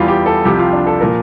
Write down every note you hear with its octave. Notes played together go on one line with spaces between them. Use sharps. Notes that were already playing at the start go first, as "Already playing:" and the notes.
Already playing: E2 E3 G3 F4
G4
A4
C2 C3 F3 G4
F4
D4
A4
A#2 F3 A#4